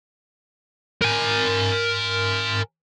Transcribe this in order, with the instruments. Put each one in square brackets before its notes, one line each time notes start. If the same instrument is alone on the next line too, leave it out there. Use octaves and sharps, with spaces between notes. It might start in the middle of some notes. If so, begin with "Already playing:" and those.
[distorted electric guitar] A#4 G#5